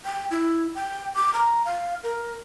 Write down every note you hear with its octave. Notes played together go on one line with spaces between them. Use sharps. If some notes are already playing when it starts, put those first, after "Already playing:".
G5
E4
G5
D6
A#5
F5
A#4